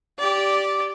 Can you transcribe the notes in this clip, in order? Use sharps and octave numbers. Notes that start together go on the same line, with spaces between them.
G4 D5